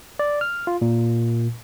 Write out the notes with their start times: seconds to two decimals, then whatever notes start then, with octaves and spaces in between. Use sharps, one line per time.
0.19 D5
0.41 F6
0.67 F4
0.82 A#2